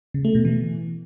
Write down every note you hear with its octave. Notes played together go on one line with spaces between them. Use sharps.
C#3
A3
B2
E3